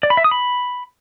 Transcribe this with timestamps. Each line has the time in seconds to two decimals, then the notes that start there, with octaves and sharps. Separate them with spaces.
0.03 D5
0.10 B5
0.17 E5
0.24 D#6
0.31 B5